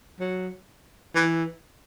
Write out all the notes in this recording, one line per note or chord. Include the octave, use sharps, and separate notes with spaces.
F#3
E3